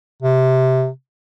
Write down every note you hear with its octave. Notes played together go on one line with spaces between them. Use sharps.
C3